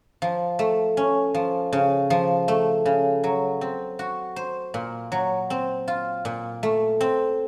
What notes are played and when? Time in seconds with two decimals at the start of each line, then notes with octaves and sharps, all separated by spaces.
0.22 F3
0.59 A3
0.97 C#4
1.34 F3
1.73 C#3
2.10 F3
2.48 A3
2.85 C#3
3.24 F#3
3.61 C4
3.99 F#4
4.36 C5
4.74 A#2
5.12 F#3
5.50 C4
5.88 F4
6.25 A#2
6.63 A3
7.01 C4